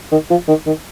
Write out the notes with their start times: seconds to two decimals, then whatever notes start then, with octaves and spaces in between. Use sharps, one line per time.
0.12 D#3
0.30 F3
0.48 D#3
0.66 D#3